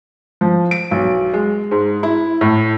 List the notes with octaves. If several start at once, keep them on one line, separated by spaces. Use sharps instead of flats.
F3
D7
B1
G#3
G#2
E4
A2